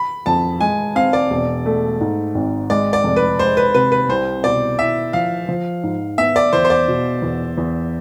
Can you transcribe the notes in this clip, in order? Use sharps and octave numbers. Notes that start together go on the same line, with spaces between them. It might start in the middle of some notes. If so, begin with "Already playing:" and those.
Already playing: B5
F2 A5
G#3 G#5
C4 F5
D5
E1
A3
G#2
G#1
G#3 D5
D5
F1
B4
G#3 C5
B4
C3 B4
B4
C2 C5
B2 D5
E4 E5
F3 F5
F3
G#2
B3 E5
D5
E2 C5
C5
D5
B2
E2
E2